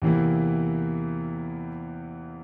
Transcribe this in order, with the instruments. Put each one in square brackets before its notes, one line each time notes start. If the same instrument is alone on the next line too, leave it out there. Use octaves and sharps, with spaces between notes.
[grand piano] E2 C3 E3 A#3 E4